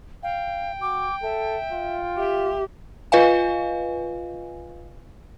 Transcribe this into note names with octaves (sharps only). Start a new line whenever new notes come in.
F5 G5
F#4 D6
A4 E5
F4
G4 E5
F4 B4 D#5 F5 G#5